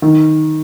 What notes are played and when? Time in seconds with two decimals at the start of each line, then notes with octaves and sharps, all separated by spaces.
0.02 D#3